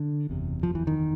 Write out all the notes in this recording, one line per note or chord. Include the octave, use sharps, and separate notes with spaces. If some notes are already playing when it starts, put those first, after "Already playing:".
Already playing: D3
F#1 E2 C3
F3
E3
D#3